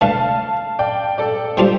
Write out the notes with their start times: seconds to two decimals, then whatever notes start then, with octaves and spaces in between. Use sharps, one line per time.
0.01 D2 D3 A3 F5 A5
0.79 D5 G5
1.18 A4 D5
1.57 G3 D4 F4 G4 C5 D5 F5